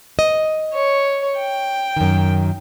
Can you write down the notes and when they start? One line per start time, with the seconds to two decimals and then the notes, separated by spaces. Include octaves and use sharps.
0.19 D#5
0.74 C#5
1.38 G5
1.97 F#2 D#3